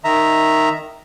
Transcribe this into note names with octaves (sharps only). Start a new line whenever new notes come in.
D#3 E5 A#5